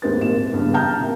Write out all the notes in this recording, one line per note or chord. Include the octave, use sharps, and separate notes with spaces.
D#2 G#2 C4 G4 B4 A6
G#1 A#2 E7
E2 G2 C#3
F5 G5 A5 A#5 F6 G6
C3 A#3